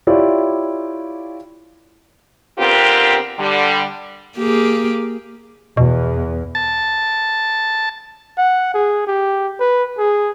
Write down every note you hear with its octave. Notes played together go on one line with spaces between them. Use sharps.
E4 F4 G4 C#5 D5
D3 B3 C4 F4 G4 A#4
D3 G3
A#3 G4 G#4
E2 B2
A5
F#5
G#4
G4
B4
G#4